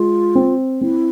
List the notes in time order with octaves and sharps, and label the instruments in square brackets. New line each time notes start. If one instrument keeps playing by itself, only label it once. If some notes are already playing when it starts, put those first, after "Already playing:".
Already playing: [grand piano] G#3 [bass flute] F4
[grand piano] C4
[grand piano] C4 [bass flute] E4